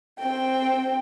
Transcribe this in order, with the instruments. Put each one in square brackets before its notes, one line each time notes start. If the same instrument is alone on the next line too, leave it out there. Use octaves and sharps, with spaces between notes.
[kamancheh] C4 G5